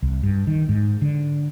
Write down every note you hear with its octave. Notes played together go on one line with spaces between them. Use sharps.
C2
G2
D#3
G#2
D3